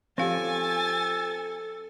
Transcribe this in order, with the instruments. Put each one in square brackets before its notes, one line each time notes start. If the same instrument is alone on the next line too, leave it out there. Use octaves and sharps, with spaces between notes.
[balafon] F3 F5 [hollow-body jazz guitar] C4 F4 G4 [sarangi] A4 [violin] G#5 A6